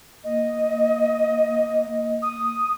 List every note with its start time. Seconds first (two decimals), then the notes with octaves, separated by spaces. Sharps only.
0.24 A#3 D#5
2.22 D#6